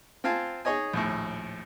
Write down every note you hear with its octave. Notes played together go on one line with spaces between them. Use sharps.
C4 F4 F5 G#5 A5
D#4 G#4 C#5 D#5 G#5
A#1 D#2 A2